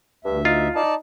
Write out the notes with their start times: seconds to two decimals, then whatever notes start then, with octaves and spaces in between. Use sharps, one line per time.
0.25 D2 G2 E5
0.45 D#4 F4
0.76 D#4 D5 A5